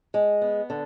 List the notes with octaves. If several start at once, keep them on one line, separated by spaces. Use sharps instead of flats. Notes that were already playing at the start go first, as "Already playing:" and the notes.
G#3
B3
D3